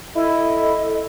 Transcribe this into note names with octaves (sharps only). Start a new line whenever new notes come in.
E4 A4 D#5